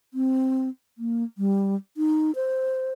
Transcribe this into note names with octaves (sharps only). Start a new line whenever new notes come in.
C4
A#3
G3
D#4
C5